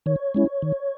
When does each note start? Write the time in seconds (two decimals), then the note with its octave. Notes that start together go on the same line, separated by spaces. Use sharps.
0.06 D#3 C#5
0.34 G#3 C#4 E4
0.62 D#3